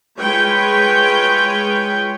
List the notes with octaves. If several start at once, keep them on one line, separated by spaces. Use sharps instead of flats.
G#3 F4 B4 C#5 G5